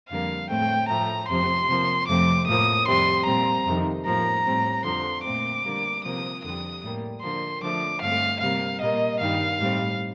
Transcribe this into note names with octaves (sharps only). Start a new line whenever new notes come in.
F2 D3 G3 A#3 F5
A2 A3 C4 G5
A2 F3 A3 A#5
F2 C3 F3 C6
C3 F3 A#3
F2 C3 F3 A3 C4 D6
A2 F3 A#3 D#6
F2 C3 G3 C6
A#2 G3 C4 A#5
F2 C3 D#3
A2 F3 A#3 A#5
A2 G3 C4
F2 D3 F3 C6
A#2 A3 C4 D6
D3 G3 A#3
C3 F3 A#3 D#6
F2 D3 G3 D#6
A2 G3 A#3
D3 F3 A#3 C6
D3 F3 A3 D6
G2 D3 A3 C4 F5
C3 G3 A#3 F5
A#2 G3 A#3 D#5
G2 D#3 G3 F5
A2 G3 C4